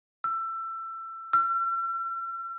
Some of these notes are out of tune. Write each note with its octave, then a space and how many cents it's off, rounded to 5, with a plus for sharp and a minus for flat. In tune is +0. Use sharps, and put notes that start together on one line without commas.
E6 +25
E6 +45